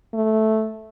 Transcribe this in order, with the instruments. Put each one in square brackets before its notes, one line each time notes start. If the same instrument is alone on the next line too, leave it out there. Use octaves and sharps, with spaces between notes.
[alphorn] A3